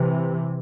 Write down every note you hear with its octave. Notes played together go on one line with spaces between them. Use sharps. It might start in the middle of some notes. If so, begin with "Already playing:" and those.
Already playing: C3 E3